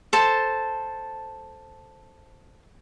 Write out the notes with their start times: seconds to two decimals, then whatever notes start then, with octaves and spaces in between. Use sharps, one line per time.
0.13 A4 C5 A5